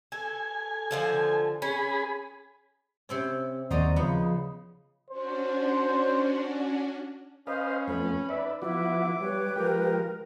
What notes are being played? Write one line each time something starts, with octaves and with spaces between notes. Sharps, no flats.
A4 G#5
D3 F3 A4
C#4 G#4 B5
C3 C4 C#4
D#2 D#4 F#4 C5 D5 D#5 A#5
C#3 F3 B3
C#4 D4 F#4 C5
C#4 B4 C5 D#5 F5
F2 A3 B3 B5
D#4 B4 D5 E5
F3 B3 E4 F#4 E5 D6
G3 B4 C#5
F3 G#3 G4 A#4 G5